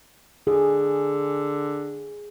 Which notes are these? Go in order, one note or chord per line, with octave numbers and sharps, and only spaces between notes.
D3 G#4